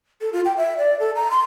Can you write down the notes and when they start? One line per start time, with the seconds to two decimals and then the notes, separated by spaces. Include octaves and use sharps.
0.21 A4
0.33 F4
0.45 G5
0.57 E5
0.78 D5
0.99 A4
1.15 A#5
1.31 C6